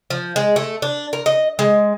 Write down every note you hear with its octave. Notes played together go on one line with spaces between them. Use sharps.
F3
G#3
A3
D4
A#4
D#5
G#3